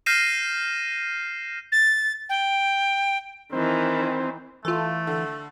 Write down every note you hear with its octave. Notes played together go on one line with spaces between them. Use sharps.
F6 G6 A#6 C7 D#7 E7
A6
G5
D#3 E3 C4
E3 A3 F4 A4
D3